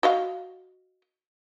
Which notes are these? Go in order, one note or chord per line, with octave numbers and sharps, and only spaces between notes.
F#4 D#5 F5